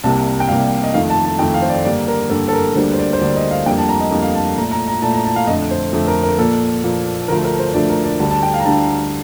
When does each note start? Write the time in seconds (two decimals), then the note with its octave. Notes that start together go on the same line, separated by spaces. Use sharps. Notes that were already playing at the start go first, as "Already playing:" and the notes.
0.04 C2 C3 G3 A#3 A5
0.40 G5
0.48 C2 C3 G3 A#3 F5
0.84 D#5
0.94 F2 D#3 A3 F5
1.10 A5
1.25 A5
1.39 F2 D#3 A3 G5
1.54 F5
1.62 C5
1.69 D5
1.84 G2 D3 G3 A#3 D5
2.08 A#4
2.30 G2 D3 G3 A#3 A4
2.48 A4
2.53 A#4
2.75 D2 D3 G3 A#3 C5
2.93 C5
2.99 D5
3.13 C5
3.20 D2 D3 G3 A#3 D5
3.37 D#5
3.51 F5
3.66 F2 D3 G3 A#3 G5
3.78 A5
3.89 A#5
4.01 D#5
4.11 F2 D3 G3 A#3 D#5
4.22 F5
4.35 A5
4.56 A#2 A3 A#5
4.71 A#5
4.88 A#5
5.02 A#2 A3 A5
5.14 A#5
5.25 A5
5.36 F5
5.47 F2 D#5
5.50 D3 A3
5.71 C5
5.93 F2 D3 A3
6.07 A#4
6.23 A#4
6.38 A#2 F3 A#3 A4
6.84 A#2 F3 A#3
7.28 D2 D3 F3 A3 A#4
7.45 A#4
7.59 C5
7.69 C5
7.74 D2 D3 F3 A3 D5
7.89 A#4
8.04 D5
8.20 D2 D3 G3 A5
8.31 A5
8.43 G5
8.54 F5
8.60 A#5
8.65 D2 D3 G3 A5